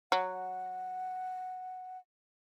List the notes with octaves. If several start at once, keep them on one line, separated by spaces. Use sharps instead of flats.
F#3 F#5